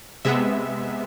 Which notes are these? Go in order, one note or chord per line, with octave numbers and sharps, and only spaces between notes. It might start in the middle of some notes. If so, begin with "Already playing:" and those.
C3 G#3 B3 E5